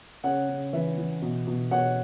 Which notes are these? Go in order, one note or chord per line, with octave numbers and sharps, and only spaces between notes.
C#3 C#5 F#5
C#3
E3 B4 E5
E3
B2
B2
B2 C#5 F#5